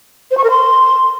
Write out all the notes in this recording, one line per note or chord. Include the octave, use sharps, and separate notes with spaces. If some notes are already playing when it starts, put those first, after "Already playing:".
C5
C#6
A#4
C6